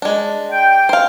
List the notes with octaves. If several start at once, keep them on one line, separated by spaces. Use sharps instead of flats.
G#3 D4
G5
C5 F5